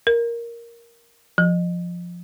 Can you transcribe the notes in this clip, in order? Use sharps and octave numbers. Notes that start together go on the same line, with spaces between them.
A#4
F3